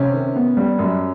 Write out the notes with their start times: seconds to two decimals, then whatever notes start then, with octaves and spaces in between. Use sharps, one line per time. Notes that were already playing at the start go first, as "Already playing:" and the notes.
Already playing: C3 C#4
0.14 D#3
0.36 B3
0.57 G3
0.79 F#2